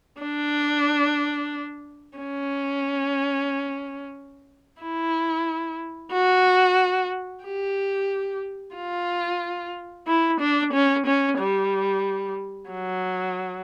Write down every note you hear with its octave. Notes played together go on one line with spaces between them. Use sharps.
D4
C#4
E4
F#4
G4
F4
E4
D4
C#4
C#4
G3
F#3